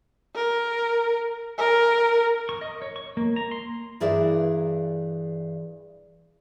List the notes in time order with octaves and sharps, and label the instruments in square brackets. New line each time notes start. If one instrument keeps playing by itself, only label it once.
[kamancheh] A#4
A#4
[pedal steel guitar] C#6
D#5
C#5
C#6
A#3
A#5
C6
[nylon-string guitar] G2 E3 G#4 A#4 D5 E5